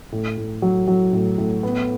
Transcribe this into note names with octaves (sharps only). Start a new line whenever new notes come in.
A2
A2
F#3
F#3
A2
A2
B3